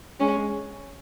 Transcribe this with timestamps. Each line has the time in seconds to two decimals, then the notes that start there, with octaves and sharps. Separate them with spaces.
0.20 G#3 C#4